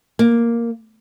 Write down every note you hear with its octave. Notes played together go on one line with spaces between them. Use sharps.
A#3